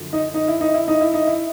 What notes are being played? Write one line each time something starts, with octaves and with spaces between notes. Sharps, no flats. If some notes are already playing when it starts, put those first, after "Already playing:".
Already playing: F#2 D3 F3
D#4
D#4
E4
D#4
E4
D#4
E4
D#4
E4